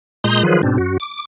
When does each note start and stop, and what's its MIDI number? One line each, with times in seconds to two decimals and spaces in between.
0.24 0.43 46
0.24 0.43 56
0.24 0.43 82
0.24 0.43 84
0.24 0.43 87
0.24 0.43 91
0.43 0.61 51
0.43 0.61 53
0.43 0.61 54
0.43 0.61 65
0.43 0.61 68
0.43 0.61 71
0.63 0.78 44
0.63 0.78 47
0.63 0.78 60
0.63 0.78 62
0.78 0.97 42
0.78 0.97 66
1.00 1.25 86